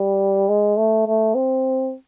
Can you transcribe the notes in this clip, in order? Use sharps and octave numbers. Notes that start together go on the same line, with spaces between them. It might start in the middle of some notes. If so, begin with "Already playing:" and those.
Already playing: G3
G#3
A3
A3
C4